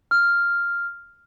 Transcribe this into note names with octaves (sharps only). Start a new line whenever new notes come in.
F6